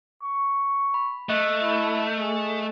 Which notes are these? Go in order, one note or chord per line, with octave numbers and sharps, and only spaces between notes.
C#6
B5
A3 D#5 E5 F#6
E4
G#4